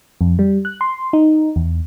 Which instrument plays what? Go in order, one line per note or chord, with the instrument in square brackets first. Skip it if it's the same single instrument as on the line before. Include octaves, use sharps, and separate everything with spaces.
[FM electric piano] F2
G3
F#6
C6
D#4
E2